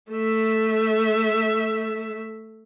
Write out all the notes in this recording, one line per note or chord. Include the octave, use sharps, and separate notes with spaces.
A3 E5